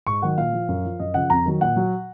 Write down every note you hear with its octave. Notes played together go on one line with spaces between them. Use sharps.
G#2 C#6
D#3 F#3 F#5
A#2 F5
F3
F#2
F3
F#2 D#5
C#3 F3 F#5
F2 A#5
D#3 F#3
A#2 F#5
F#3